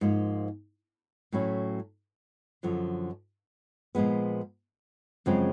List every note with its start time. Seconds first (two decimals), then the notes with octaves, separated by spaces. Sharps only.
0.01 G#2 F3 A#3
1.32 A2 F#3 A3 C#4 E4
2.63 F#2 D3 F3
3.95 A#2 F3 G#3 B3
5.26 F#2 C#3 F3 G#3 C4